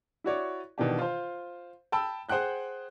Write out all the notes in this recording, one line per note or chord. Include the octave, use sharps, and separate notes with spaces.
E4 F#4 C#5 D5
B2 D#3 E3 D4 G4
F4 C5
G5 A5 B5 E6
G#4 C5 F#5 G5 F#6 G6